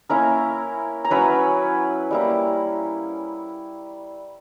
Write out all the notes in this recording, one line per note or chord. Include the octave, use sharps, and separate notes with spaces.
A#3 C#4 E4 A#4 A#5
A#5
F#3 C#4 E4 B4 B5
G3 A#3 E4